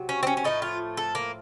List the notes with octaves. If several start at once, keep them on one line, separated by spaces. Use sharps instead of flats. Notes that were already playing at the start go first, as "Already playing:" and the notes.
Already playing: C3 F#3
C#4
C4
C#4
C#4
A2 F3 A3 D#4
F4
A4
A#3